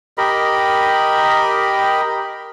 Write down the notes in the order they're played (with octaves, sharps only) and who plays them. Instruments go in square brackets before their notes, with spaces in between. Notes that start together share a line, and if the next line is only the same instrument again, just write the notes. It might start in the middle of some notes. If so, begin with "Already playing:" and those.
[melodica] G4 A#4 D#5 B5